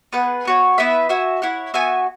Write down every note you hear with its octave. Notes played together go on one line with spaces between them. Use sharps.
B3 G#4 B4 F#5
B3 F#4 C#5
B3 E4 B4 E5
F#4 E5 G#5
E4 C#5 F#5
B3 F#4 E5 G#5